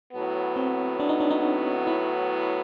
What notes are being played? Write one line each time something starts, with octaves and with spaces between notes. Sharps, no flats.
A2 F#3 B3
C4
D4
D#4
D4
D#4
D4
E4